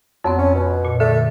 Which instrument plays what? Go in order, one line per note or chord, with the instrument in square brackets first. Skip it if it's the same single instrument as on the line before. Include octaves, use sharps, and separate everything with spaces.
[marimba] F2 B3 C4 [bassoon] F#3
[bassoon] C#4
B2
[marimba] A#2
[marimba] D3 [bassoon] A3